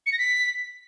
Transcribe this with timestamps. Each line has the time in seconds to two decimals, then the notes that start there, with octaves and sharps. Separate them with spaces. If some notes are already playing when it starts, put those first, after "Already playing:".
0.06 C#7
0.12 A#6
0.18 B6